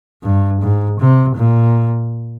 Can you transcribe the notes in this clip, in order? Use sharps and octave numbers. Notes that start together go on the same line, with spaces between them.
G2
G#2
C3
A#2